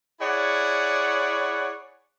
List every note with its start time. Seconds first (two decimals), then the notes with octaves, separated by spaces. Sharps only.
0.20 E4 G#4 C#5 D5 F#5